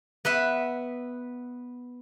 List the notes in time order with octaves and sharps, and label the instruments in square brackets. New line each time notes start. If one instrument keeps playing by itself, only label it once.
[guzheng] B3 B4 E5